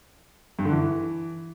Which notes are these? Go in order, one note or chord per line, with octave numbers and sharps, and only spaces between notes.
G2
D3
E3